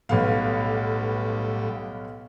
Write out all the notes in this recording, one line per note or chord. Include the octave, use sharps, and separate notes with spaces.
B1 A2 G3 B3 F5